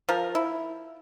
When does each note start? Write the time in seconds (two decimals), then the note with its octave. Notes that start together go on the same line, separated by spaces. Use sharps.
0.09 F3 A#4
0.35 E4